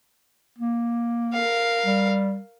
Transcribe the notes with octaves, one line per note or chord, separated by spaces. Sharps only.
A#3
A#4 F5
G3